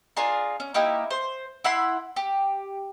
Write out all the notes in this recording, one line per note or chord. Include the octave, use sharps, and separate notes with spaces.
D4 F4 G#4 A#4
C#4
A#3 D#4 E4 G4
C5
E4 F#5 B5 C6
G4